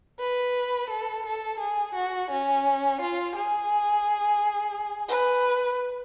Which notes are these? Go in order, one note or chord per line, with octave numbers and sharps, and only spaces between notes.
B4
A4
A4
G#4
F#4
C#4
F4
G#4
B4